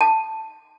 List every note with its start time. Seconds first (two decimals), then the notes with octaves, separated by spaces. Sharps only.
0.01 A5